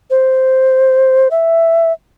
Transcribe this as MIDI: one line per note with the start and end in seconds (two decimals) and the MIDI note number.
0.10 1.28 72
1.31 1.92 76